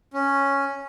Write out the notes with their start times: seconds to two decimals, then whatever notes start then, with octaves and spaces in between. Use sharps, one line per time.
0.14 C#4